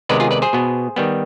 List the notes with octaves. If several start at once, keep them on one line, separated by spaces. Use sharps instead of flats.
C3 D#3 G#3 B3 B4 D5
F4 G#4
B4 D5
G#4 C5
B2 B3
D#3 G3 B3